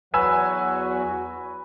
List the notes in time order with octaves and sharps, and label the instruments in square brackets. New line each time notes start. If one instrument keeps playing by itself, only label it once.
[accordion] E2 F#3 F#4 [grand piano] B4 G#5 E6